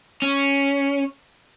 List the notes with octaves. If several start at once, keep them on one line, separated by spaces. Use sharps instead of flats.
C#4